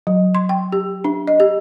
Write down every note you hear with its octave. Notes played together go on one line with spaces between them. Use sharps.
F#3
C6
G5
G4
D4
D#5
G4